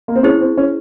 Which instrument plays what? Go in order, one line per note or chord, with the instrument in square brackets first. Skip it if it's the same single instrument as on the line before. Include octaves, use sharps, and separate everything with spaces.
[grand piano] A#3
C4
[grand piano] C#4 [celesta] E4 G#4 C5
[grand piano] C4
C#4